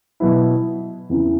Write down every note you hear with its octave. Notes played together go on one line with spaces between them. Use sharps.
B2 F#3 B3 E4
E2 C#3 E3